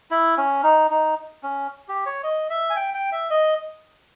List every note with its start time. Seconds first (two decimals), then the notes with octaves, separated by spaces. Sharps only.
0.11 E4
0.38 C#4
0.63 D#4
0.91 D#4
1.43 C#4
1.88 G4
2.06 C#5
2.24 D#5
2.50 E5
2.70 G#5
2.76 G5
2.94 G5
3.12 E5
3.30 D#5